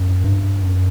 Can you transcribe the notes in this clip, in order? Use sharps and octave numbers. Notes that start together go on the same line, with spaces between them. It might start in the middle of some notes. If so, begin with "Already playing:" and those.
Already playing: F#2
G2
F#2